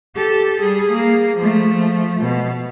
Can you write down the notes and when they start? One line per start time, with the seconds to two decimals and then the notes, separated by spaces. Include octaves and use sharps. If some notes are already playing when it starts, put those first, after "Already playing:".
0.16 G4 A4
0.61 G3 G#4
0.92 A#3
1.37 F3 A3
2.21 B2